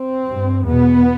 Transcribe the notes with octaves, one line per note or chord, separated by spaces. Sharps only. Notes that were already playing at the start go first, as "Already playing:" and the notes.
Already playing: C4
G2
E2 B2 B3